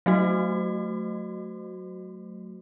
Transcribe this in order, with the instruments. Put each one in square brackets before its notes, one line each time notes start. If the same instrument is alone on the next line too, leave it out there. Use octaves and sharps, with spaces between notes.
[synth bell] F#3 A3 F#4